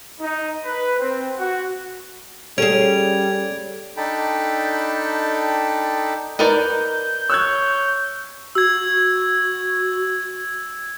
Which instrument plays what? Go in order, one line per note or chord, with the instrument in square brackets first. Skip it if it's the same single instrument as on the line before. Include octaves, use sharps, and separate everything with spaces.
[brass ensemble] D#4
B4
C4
F#4
[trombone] G3 [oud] C#4 G#4 [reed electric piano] A4 C#5 [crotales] G#6 D7 F7
[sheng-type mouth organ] D4 D#4 A4 G5 A5 B5
[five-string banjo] D#4 A#4 D5 [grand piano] B4 [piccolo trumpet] G6
[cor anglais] C#5 [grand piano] E6 F#6 G#6
[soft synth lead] F#4 [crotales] E6 G#6